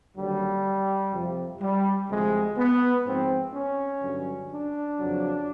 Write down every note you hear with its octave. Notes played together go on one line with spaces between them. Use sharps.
D#2 D3 F#3 G3
F2 C3 F3
G3
D2 C3 F3 G#3
B3
G#2 F3 C4
C#4
G2 D3 F#3
D4
F2 C#3 F#3